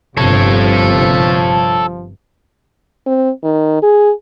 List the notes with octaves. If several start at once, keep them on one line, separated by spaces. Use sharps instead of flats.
G1 G2 C3 F3 A4 C#5
C4
D#3
G#4